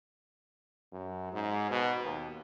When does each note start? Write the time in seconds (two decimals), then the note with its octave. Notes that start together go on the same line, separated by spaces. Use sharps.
0.92 F#2
1.32 G#2
1.70 B2
2.03 D#2